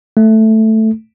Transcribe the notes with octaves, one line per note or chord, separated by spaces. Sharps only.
A3